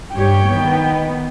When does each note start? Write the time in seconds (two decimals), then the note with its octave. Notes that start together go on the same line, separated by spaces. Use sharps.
0.15 G2 G4 C#5 G5
0.49 D#3 B3